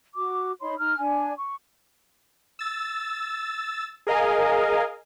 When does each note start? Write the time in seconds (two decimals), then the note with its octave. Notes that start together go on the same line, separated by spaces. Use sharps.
0.14 F#4 D6
0.61 D#4 C#5 B5 C6
0.78 D#4 A#5 F6
0.98 D4 G#5
1.37 C#6
2.59 E6 A6
4.07 G#4 A#4 D#5 F5 G#5